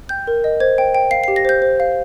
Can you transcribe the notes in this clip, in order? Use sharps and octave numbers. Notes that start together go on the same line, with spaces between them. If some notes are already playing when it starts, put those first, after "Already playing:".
G5 G6
A#4
D#5
C5 G#6
G5
G5
F5 C7
G4 C7
A#6
C5 G6
C5
F5